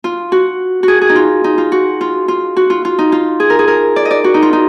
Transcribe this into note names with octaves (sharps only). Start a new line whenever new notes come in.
F4
F#4
F#4 G#4
G#4
D#4
F4
D#4
F4
F#4
F4
F4
F#4
F4
F4
D#4
F4
G#4
A#4
G#4
A#4
D5
D#5
D5
F#4
D#4
F4
D#4